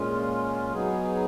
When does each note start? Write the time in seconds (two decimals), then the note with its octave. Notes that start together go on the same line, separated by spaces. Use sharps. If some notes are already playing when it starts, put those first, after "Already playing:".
Already playing: A#2 G#3 C#4 F4
0.73 F#3 B3 D#4 G#4